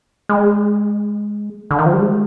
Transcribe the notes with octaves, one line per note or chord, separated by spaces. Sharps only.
G#3
D3
D#3
F3
G3
G#3